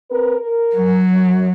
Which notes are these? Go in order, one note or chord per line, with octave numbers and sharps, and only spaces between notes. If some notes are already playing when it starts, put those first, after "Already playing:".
C4 A#4 B4
A#4
F#3
F#2